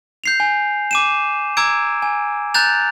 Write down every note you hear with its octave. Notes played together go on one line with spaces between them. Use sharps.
G6 C7 F7
G#5
D6 D#7 E7
A#5 D6 E6 G#6 D7
G#5
A#5 F#6 G6 A6 F7